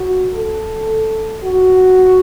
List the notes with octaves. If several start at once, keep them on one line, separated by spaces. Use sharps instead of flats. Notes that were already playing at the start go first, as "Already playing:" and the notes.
Already playing: F#4
A4
F#4